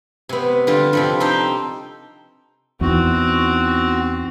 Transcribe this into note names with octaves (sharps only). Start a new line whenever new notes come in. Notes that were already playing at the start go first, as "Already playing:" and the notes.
C3 B3
D3 G3 F4
C3 F3 G3
D#4 G4 A4 C5 G5
E2 B3 C4 D#4 E4 F#4